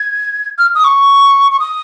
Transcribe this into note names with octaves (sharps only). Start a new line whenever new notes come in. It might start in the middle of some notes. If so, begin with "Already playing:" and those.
Already playing: G#6
F6
D#6
C#6
C#6
D#6